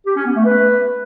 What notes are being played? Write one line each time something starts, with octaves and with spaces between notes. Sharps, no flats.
G4
C#4
B3
A3
B4